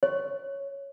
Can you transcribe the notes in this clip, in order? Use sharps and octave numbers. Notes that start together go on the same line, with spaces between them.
C#5